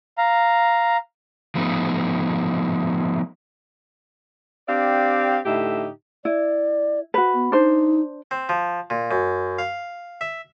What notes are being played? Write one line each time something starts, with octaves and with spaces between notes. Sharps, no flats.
F5 A#5
F3 A3 B3 D#4
C4 D4 G4 D5 F5
A2 D3 D#4 G4 E5
E4 D5
F#4 B4
B3
D4 D#4 C5
C4
F3
A#2
F#2
F5
E5